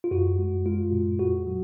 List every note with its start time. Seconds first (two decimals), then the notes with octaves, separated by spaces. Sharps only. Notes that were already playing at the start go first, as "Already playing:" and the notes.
0.04 F4
0.11 F#2 F#4
0.39 G#3
0.66 G#3 F4
0.92 A#2
1.19 F2 F#4
1.46 F#3